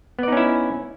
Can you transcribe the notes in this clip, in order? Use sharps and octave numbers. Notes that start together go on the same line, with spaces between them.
B3 C#4 D#4 E4 D5